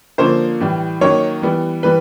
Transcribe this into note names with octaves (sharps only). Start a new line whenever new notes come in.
D3 F3 A#3 C#4 C5
A2 E3 G3
D#3 F#3 A#3 C#4 C#5
E3 G3 B3
E3 G3 B4